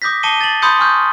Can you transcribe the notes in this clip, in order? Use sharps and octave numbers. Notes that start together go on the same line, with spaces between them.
D6 D#6 G6 A#6 B6
A5 D6 C7 C#7 D#7 G7
D6 A6 E7 F#7
B5 C6 D#6 G6 A6 C#7
G#5 C#6 F6 G6